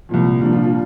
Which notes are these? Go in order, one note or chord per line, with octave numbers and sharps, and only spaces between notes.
C2 A#2 F3
C2 A#2 F3 D4
D4 F4
D4 F4